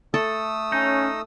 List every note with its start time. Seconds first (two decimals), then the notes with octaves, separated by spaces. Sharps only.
0.14 A3 A4 D#6 E6
0.72 C#4 D#4